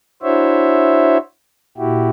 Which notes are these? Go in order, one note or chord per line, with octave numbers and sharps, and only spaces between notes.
D4 E4 F#4 C5 C#5 E5
A#2 E4 F#4 G4